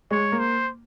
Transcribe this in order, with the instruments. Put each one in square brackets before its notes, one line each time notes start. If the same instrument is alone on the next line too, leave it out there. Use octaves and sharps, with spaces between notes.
[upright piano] G#3 [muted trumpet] C#5
[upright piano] A#3
[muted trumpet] C5